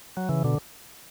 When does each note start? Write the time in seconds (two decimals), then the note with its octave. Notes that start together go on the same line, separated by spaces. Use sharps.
0.17 F#3
0.29 C#3 E3
0.44 B2 D3